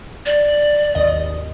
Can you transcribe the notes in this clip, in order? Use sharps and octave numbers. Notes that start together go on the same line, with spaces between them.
D5
G#1 D#2 D#5